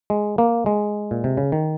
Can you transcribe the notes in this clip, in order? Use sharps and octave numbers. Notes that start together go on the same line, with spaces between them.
G#3
A#3
G#3
A#2
C3
C#3
D#3